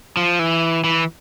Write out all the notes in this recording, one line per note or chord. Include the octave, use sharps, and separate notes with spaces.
F3
E3
E3